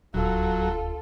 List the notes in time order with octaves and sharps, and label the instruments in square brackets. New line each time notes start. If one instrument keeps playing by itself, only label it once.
[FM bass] D#1 [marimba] D2 E6 [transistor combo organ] F#3 [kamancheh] F4 A4